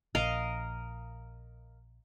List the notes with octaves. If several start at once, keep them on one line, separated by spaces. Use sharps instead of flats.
A#1 A#4 D#5 F5